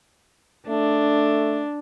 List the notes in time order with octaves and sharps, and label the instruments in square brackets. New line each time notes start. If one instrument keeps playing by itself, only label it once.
[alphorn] A3 [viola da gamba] D4